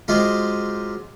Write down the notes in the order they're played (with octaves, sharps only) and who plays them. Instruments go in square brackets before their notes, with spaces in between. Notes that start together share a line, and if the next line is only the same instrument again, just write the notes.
[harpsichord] F#3 G#3 C4 F4 G4 G#4